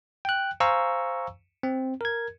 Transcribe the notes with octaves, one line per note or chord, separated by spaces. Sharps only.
G5 F#6
C5 F5 G#5 A#5 C#6 E6
C4
A#4 G#6